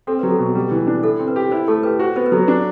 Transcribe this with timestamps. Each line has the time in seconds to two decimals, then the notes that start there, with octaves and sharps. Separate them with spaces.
0.07 C4 A4
0.19 F#3 B4
0.31 A4
0.39 B2
0.55 G3
0.71 E3
0.87 D4
1.03 E4 A4
1.19 C4
1.28 B4
1.36 G4
1.51 E4 C5
1.68 A3 A4
1.83 G4 B4
1.99 F#4 C5
2.16 B3 C5
2.26 B4
2.32 F#3 A4
2.48 D4 F#4